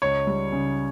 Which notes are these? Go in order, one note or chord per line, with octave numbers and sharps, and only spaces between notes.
C#2 C#5
G3
C#3